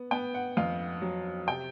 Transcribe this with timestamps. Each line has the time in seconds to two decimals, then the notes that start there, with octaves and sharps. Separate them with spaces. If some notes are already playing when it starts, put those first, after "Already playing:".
Already playing: B3
0.11 B3 G5
0.34 F#5
0.57 F2 F5
1.02 F#3
1.47 C3 G5